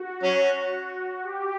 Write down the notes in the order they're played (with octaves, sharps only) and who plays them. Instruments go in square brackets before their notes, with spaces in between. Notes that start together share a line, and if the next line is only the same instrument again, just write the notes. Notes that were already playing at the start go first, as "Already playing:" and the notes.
Already playing: [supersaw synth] F#4
[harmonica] F#3 C#4
[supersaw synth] G4